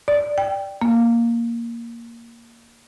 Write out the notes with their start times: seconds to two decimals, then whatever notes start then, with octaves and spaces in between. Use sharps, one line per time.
0.08 D5
0.38 G5
0.81 A#3